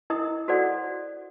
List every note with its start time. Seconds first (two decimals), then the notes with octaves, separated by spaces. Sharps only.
0.10 E4 A#4 D#5 D#6
0.48 F#4 A4 C5 D5 F#5